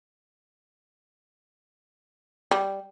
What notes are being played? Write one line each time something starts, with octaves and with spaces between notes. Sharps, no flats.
G3